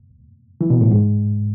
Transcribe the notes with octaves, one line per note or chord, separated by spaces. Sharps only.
E3
B2
A2
G#2